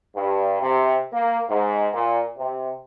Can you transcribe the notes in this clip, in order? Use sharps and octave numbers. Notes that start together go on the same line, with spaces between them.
G2
C3
A#3
G#2
A#2
C3